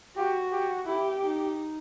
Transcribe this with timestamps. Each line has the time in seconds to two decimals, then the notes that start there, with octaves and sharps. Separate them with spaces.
0.16 F#4 G4
0.51 G4
0.86 E4 G4
1.21 D#4